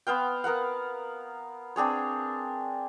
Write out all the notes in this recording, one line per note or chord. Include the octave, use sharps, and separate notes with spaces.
B3 C5 F5 G5
B3 A#4 F5 F#5
C4 D4 G#4 C#5